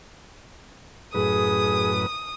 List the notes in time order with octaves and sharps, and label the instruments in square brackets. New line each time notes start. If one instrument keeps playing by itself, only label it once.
[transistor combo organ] F#2 A2 B4 [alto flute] G#4 [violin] D#6